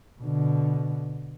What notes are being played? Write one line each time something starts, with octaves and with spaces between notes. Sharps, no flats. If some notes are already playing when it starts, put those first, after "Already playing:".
B2 D3